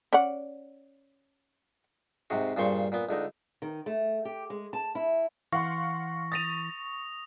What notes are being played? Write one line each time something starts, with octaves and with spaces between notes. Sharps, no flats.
C#4 D5 F#5
G#2 C3 F#4
G2 A#2 C#3 C5 C#6
A#2 B3
C#2 D3 D#4
D#3
A3
G4
G#3
A5
E4
E3 F5 F#5 C6 C#6 A#6
D#6 A6 A#6 D#7 F7